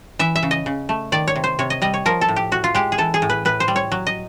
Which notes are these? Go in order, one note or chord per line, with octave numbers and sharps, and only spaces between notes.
E3 E5
E5
C#3
D#5
C#3
A3
D#3 D5
C#5
C3
C5
C3 C#5
D#5
G3 D#5
C#5
F3 A#4
A4
A2
G4
A2 F#4
F4
G#3 G4
G#4
E3 A4
G#4
A2
B4
A2 B4
C5
G3
C#5
F#3
D#5